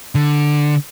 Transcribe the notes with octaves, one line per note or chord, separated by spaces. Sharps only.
D3